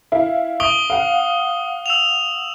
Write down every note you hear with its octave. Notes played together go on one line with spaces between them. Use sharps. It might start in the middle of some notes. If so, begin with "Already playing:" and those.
E4 F5
C#6 D#6 D7 G7
F5 F#5
E6 E7 F7